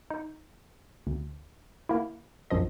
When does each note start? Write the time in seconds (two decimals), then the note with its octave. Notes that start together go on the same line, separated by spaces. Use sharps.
0.10 D#4
1.07 D2
1.89 A#3 E4
2.50 A#1 F#2 F3 D#5